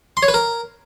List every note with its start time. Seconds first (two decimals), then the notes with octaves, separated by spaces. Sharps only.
0.17 C6
0.23 C#5
0.28 B4
0.34 A#4